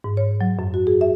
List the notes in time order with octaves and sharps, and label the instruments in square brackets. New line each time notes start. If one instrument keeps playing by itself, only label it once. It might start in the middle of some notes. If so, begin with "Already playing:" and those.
[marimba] G#2
C#5
F#3
F#2
F#4
G#4
E5